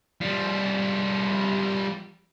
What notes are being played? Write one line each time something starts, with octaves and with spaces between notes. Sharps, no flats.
G3 F4